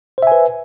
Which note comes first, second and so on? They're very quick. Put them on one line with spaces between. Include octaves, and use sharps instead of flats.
C5 E5 G#5 B4